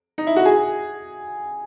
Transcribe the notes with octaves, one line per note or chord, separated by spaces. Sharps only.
D#4
E4
F#4
G#4